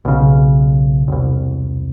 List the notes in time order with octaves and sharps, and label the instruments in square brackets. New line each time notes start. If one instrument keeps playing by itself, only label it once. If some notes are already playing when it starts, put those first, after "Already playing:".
[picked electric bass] B1 C#3
E1 C2